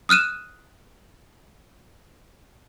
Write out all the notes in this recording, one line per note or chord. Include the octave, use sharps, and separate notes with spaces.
D#6 F6 F#6 D#7 E7